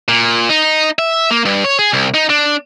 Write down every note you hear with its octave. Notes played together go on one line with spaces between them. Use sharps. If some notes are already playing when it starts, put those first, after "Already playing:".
A#2
D#4
E5
A#3
G2
C#5
G#4
C2
D#4
D4